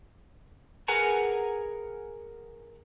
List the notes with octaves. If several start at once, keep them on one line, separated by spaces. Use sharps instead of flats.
G#4 A#4 B4 F#5 G#5 A#5